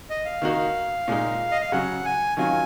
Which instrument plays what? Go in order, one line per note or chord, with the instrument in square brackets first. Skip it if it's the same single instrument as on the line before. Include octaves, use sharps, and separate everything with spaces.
[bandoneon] D#5
F5
[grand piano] D#3 A#3 D#4 F#4
A#2 G#3 D#4
[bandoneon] D#5
F5
[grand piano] C#3 F#3 C#4 [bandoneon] F#5
[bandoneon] G#5
[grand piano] D#3 F#3 C#4 F4 [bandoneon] G#5